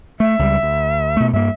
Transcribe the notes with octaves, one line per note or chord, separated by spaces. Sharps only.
A3 E5
C#2 G3
D2
B2 A3
G2 A#3 E5